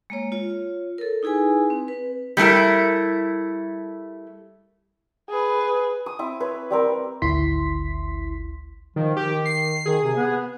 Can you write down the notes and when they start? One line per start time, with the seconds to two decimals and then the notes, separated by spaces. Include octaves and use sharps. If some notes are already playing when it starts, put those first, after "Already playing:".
0.10 G#3 A#3 C#5
0.32 F4 C#5
0.98 A4 A#4
1.23 D#4 E4 G#4 B4 G#5
1.70 C4
1.88 B4
2.37 G3 A3 E4 A#4
5.29 G#4 B4
6.06 D#6
6.19 C4 E4
6.40 B4 C#5 E5
6.70 G3 C4 A#4
7.22 G#1 D2 E4 C6 B6
8.96 D#3 F3
9.17 D#3 G4
9.46 C7
9.86 D#3 G#4
10.03 C3
10.16 B3